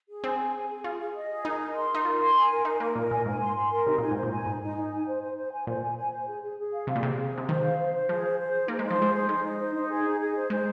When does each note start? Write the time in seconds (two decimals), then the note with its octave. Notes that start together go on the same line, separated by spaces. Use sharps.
0.09 G#4
0.24 C4 G#5
0.39 G#4
0.55 G#5
0.70 G#4
0.84 F4 G#4
1.00 G#4
1.15 D#5
1.30 G#4
1.45 D#4 A#4
1.60 A#4
1.75 C6
1.91 D#4 A#4
2.05 F4 A#4
2.20 C6
2.36 G#5
2.51 A#4
2.65 D#4 A#4
2.80 A#3 A#4
2.95 A#2 A#4
3.11 A#2 G#5
3.26 G#2 G#5
3.41 C6
3.56 C6
3.71 A#4
3.86 C3 D#4
3.98 A#2 G#5
4.11 G#2
4.16 C5
4.23 A#2
4.32 G#5
4.46 G#2 D#4
4.62 D#4
4.77 D#4
4.92 G#5
5.07 C5
5.22 C5
5.37 C5
5.52 G#5
5.67 A#2 C5
5.82 G#5
5.97 G#5
6.12 C5
6.28 G#4
6.43 G#4
6.58 G#4
6.73 F5
6.87 C3 F5
6.96 A#2
7.03 C3 G#4
7.18 G#4
7.33 C3 C5
7.48 D#3 C5
7.63 F5
7.78 C5
7.93 C5
8.09 F3 G#4
8.24 C5
8.39 C5
8.54 G#4
8.68 A#3 D#4
8.79 G#3 C5
8.91 F3
8.99 G#3 G#4
9.14 C5
9.29 G#3 D#4
9.44 D#4
9.59 C5
9.74 D#4
9.90 G#4
10.04 D#4
10.20 G#4
10.35 C5
10.50 G#3 C5